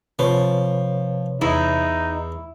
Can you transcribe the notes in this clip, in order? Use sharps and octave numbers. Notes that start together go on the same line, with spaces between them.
C3 F3 B4 C#5
E2 D#4 E4